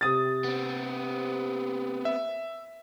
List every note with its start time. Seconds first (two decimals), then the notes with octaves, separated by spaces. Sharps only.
0.01 C3 D#6 A6
0.44 B3 C4
2.05 E5